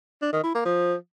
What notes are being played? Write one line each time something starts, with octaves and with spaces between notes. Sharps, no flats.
D4
D#3
E4
A#3
F3